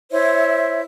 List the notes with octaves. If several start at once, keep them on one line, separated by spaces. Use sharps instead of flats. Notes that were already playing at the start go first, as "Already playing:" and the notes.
E4 C5 C#5 E5